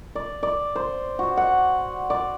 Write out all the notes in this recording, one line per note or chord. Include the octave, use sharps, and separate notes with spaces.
D5
D5
C5
F#4
F#5
D5